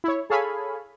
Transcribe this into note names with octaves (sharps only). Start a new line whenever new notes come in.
E4 C#5
G#4 A4 C#5 F5 G#5 B5